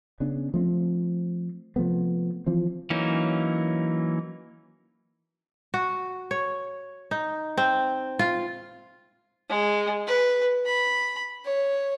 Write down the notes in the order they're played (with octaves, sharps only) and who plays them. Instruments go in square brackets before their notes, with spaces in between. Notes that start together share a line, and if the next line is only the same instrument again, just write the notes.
[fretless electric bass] C#3 B3 C#4 D4
F3 A3 C4
C3 F3 A3 B3
E3 F3 C4
[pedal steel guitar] E3 F#3 A#3 C#4 D#4
[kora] F#4
C#5
D#4
C4
F4
[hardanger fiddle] G#3
B4
B5
C#5